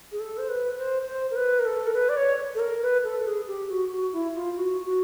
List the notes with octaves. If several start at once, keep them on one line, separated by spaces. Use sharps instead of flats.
G#4
A4
C5
B4
C5
C5
A#4
B4
A#4
A4
A#4
B4
D5
C#5
A4
A#4
B4
A4
G#4
G4
F#4
F#4
E4
F4
F#4
F#4